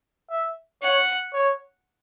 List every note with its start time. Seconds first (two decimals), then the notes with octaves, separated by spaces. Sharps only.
0.30 E5
0.82 C#5 F#5
1.33 C#5